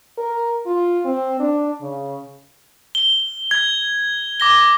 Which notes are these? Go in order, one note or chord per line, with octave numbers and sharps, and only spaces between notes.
A#4
F4
C4
D4
C#3
G7
G#6
D6 A#6 G7